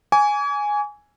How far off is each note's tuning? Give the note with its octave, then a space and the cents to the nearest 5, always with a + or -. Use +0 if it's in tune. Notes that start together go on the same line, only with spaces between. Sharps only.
G#5 +0 D6 -45